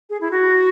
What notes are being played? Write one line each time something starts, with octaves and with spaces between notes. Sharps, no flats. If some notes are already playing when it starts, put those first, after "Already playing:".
G#4
E4
F#4